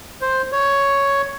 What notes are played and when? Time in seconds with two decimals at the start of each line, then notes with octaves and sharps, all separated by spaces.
0.22 C5
0.52 C#5